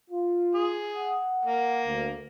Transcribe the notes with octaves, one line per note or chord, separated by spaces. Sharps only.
F4
G#4
F#5
A#3
D2